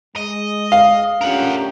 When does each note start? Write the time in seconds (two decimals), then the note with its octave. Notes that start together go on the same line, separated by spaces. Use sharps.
0.16 G#3 D#5
0.72 F5
1.21 A3 C#4 D4 F4 G4 A#4 F#5